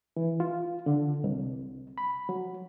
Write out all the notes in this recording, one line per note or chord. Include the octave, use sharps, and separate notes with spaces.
E3
F4
D3
C2
B5
F#3